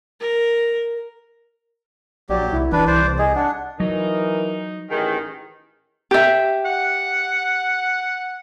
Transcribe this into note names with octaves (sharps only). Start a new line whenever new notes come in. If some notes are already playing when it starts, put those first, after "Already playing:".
A#4
A#1 F#3 G4 D5
C2 E4
D#1 E3 D4 B4
C2 C5 D5
G#4 D#5
D4 F#5
E3 F#3 D#4 A#4
A1 D#3 E3 G#4
G4 E5
F#5